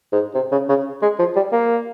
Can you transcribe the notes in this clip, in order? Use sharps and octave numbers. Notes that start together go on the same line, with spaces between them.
G#2
C3
C#3
C#3
G#3
F3
G3
A#3